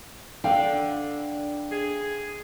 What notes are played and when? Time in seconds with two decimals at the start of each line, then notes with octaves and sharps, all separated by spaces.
0.44 D4 A4 D5 F5 G5
1.71 G#4